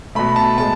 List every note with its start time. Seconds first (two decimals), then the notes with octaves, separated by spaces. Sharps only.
0.15 B2 A3 B5
0.36 A5
0.58 A2 G#3 A5